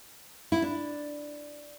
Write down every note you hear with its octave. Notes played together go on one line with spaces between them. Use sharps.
E4
D4